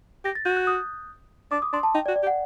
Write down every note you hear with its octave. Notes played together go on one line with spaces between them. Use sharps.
G4 A#6
A6
F#4 G6
F#6
D#6
D4 D6
D#6
D4 C6
A5
D#4 G5
D5
F#4
D5
G4
F#5